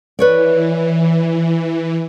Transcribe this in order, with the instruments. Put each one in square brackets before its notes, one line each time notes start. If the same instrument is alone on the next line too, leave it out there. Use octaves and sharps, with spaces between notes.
[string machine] E3 [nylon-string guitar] B4 C#5 D5